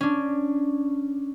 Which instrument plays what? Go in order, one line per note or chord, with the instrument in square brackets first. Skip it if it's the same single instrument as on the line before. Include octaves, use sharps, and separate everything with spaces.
[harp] C#4 D4